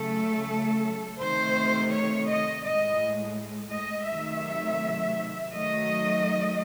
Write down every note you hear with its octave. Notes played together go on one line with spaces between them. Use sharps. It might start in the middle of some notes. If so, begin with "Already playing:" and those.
Already playing: C#3 F#3 A3 A4
C3 D#3 A3 C5
C#5
D#5
A2 G#3 D#5
D#5
C3 D#3 F#3 A3 E5
D#3 F#3 A3 D#5